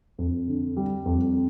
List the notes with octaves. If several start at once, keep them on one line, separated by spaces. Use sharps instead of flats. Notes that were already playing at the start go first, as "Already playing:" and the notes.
F2
D3
G3
F2